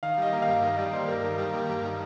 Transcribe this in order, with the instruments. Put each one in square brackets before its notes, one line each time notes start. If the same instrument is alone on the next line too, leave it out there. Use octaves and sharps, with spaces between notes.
[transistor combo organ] D#3 [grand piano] F5
[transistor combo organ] G3 [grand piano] D#5
[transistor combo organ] A#3
[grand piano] F5
[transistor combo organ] G2
[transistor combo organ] D#3 [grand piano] D#5
[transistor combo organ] G3 [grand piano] D5
[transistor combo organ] A#3 [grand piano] C5
[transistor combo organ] G2 [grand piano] A#4
[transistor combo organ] D#3
G3
A#3
G2
D#3